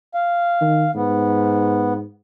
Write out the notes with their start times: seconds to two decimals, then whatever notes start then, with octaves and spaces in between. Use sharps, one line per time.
0.14 F5
0.61 D#3
0.95 G#2 B3